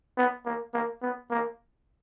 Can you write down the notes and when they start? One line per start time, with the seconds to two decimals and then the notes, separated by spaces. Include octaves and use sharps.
0.18 B3
0.45 A#3
0.74 A#3
1.02 B3
1.31 A#3